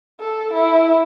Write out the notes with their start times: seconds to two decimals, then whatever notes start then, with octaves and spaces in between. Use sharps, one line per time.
0.20 A4
0.53 E4